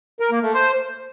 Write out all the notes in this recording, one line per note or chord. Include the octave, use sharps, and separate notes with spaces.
A#4
A#3
A3
C5